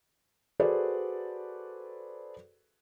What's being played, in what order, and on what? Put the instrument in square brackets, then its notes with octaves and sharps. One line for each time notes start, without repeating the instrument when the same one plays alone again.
[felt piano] F#4 G#4 A4 B4 C5 D5